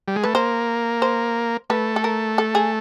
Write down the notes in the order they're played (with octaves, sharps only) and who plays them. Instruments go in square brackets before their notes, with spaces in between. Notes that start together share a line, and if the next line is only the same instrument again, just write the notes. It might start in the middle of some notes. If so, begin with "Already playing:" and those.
[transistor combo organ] G3
G#3
[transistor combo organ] A3 [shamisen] B4
[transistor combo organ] A#3 [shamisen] C5
[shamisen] C5
[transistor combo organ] A3 [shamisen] B4
[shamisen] A4
A#4
A4
G#4